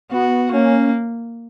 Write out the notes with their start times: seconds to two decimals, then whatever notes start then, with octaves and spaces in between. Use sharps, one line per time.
0.11 B3 F#4
0.52 A#3 C#4